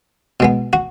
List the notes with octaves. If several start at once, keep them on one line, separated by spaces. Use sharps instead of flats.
B2 G#3 B3
F#4